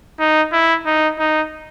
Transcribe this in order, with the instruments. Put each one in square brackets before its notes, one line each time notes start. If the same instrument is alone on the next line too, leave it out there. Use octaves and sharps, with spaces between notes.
[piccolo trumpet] D#4
E4
D#4
D#4